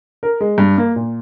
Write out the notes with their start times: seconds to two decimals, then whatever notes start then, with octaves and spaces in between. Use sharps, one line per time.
0.23 A#4
0.40 G#3
0.58 G2
0.78 A#3
0.96 A#2